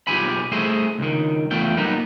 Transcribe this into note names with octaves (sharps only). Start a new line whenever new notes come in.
B1 F4 G4 G#4 G#5 B5
A3 E4 G#4 C5 D#5
C#2 D#3
E2 A3 F4 G5
F#3 G3 A#3 B3 D#4